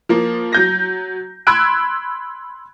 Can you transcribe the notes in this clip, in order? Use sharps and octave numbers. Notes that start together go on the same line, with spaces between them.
F3 A#3
F#3 G6 A#6
B5 C6 E6 F#6 G#6 D7